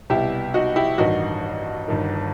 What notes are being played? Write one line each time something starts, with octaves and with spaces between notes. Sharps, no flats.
C2 B2 E4 G4
D#4 F#4
E4 G4
A1 G2 D#3 D#4 F#4
G1 G2 D#3